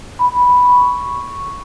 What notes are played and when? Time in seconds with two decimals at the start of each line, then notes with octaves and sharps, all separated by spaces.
0.19 B5
0.42 B5
0.65 C#6